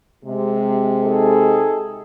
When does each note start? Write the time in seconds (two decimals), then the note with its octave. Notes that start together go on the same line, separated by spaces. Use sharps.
0.25 C3 G#3
1.04 D#4 G#4 A4